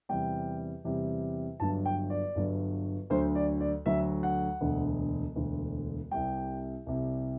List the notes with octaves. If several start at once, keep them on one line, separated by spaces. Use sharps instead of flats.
E2 C3 G3 G5
E2 C3 G3
G1 G2 F#3 A5
G5
D5
G1 G2 F#3
D2 D3 F#3 C5
D5
D5
D2 D3 F#3 E5
F#5
E1 D2 D3
E1 D2 D3
C2 C3 G3 G5
C2 C3 G3